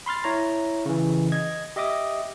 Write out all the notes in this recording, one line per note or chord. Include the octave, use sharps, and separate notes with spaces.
B5 C6 F6 A6
E4 C#5 A#5
C#3 E3
D#5 G#6
G4 D#5 E5 D6 D#6